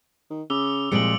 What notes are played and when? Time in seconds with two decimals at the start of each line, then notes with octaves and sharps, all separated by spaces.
0.30 D#3
0.50 C#3 D6 E6 G7
0.92 C2 A#2 F3 G#3 C#7 D7 F#7